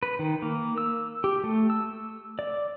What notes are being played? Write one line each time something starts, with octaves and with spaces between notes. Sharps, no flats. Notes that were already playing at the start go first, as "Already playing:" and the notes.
B4
D#3
A#3
E6
G4
A3
E6
D5